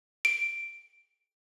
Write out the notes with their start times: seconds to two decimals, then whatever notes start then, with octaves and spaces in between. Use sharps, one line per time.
0.25 D7